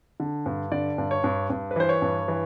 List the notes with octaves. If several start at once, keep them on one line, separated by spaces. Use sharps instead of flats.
D3
G2
D3 D5
G2
C#5
G2
G2
B4
E3 C5
C#5
G2
E3